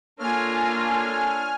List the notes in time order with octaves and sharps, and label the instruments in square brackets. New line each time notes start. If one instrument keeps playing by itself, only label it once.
[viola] A#3 F4 [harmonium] D4 A4 C#5 [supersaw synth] G#5 F6